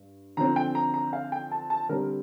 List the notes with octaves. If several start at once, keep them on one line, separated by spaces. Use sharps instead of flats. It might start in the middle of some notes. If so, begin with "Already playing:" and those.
Already playing: G2
D3 F3 C4 A#5
G5
A#5
A#5
F5
G5
A5
A5
D3 G3 C4 A#4